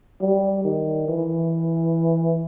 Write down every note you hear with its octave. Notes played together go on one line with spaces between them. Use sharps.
G3
D#3
E3